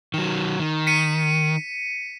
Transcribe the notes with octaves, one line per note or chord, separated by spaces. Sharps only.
D#3 F#3 E7
D#3
B6 C#7 D#7